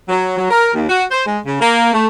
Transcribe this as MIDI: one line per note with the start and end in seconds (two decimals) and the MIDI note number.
0.09 0.34 54
0.38 0.48 54
0.51 0.70 70
0.75 0.86 39
0.89 1.04 66
1.11 1.23 72
1.26 1.39 56
1.46 1.59 49
1.61 1.91 58
1.94 2.08 57